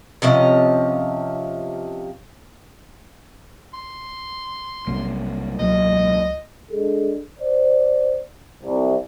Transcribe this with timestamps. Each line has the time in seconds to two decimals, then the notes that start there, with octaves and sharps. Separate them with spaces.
0.22 C3 F3 C#4 D#5
3.73 C6
4.87 B1 C3 G3 A#3
5.59 E1 C#2 F#3 A#3 D#5
6.71 G#3 D4 G#4 A4
7.39 C5 D5
8.62 C2